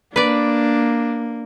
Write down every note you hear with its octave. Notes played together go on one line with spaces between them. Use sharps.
A#3 D4 B4 D5